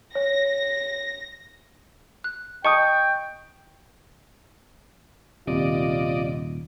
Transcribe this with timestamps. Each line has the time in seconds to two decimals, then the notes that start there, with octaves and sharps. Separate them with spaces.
0.15 C#5 A#6
2.24 F#6
2.65 D#5 G5 A5 C#6 D#6 C#7
5.47 D#1 C3 F4 D5 D#5